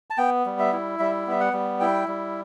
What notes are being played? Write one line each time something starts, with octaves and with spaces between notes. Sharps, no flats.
A5
B3 G5
G3
E5
E4
G3 E5
B3 E5
F#5
G3
E4 G5
G3